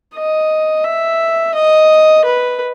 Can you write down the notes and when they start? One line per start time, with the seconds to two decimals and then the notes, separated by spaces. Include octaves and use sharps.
0.15 D#5
0.85 E5
1.55 D#5
2.25 B4